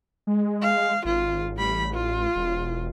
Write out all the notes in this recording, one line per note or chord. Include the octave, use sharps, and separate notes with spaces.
G#3
F5
G#1 F4
A1 G3 B5
F4
E1